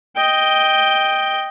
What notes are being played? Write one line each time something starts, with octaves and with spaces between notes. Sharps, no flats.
D#5 G5